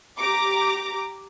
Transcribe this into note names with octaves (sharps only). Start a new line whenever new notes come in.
G4 A#5 D6